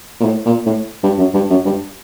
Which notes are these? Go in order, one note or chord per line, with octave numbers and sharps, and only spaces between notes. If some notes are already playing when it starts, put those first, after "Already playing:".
A#2
A2
A#2
A2
G2
F#2
G2
F#2
G2